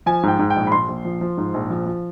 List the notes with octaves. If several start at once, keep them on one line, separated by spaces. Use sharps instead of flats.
F3 G#5
G#2 G5
G#2
G5
A#1
B5
A#1 C6
A#1
F3
F3
G#2
A#1
F3
F3